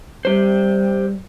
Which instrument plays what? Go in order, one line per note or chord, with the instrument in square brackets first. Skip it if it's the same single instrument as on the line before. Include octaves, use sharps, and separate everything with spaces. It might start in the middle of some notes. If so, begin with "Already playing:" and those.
[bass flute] G3 [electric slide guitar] G4 C5